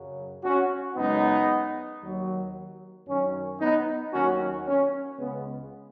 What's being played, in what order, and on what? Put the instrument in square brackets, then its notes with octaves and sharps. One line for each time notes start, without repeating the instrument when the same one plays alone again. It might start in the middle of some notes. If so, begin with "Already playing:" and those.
Already playing: [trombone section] F#2 C#3 F#3
C#4 F#4
F#2 C#3 G#3 B3 D#4
D#2 D#3 F#3
F#2 D#3 F#3 C#4
B3 D#4
D#2 D#3 F#3 C#4 F#4
C#4
C#2 C#3 G#3 B3